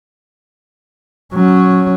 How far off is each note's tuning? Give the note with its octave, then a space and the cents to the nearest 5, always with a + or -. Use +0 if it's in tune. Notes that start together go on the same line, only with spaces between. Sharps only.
F#3 +0 C#4 +0